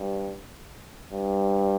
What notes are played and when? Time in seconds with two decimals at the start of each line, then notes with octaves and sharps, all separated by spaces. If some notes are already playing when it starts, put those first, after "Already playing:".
Already playing: G2
1.13 G2